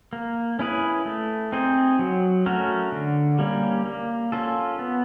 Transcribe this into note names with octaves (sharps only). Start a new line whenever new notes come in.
A#3
C#4 E4 G#4 B4
A3
C4 D#4 G#4 C5
F#3
A3 C#4 F#4 A#4
D3
G3 A#3 C#4
A#3
C#4 F4 A4
B3